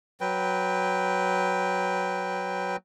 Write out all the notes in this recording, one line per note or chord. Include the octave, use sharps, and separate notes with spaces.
F#3 B4 G5